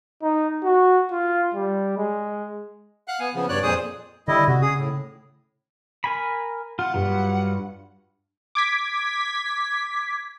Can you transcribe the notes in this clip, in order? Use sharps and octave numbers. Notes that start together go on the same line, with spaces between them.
D#4
F#4
F4
G3
G#3
F5 F#5 F#6
B3 G#5
C#3 F3 B3
G2 C#5 D5 F#6
F2 A#2 G#4 C5 D#6
D3 G3 E4 D#5
C3 F#4
C#3 G#4 D#6
A2
A#4 G#5 B5
F4 F#5
G2 F#3 G3 F4 G4
D6 G#6 B6